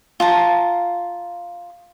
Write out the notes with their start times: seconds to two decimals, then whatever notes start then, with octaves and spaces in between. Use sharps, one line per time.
0.20 F4 A5 A#5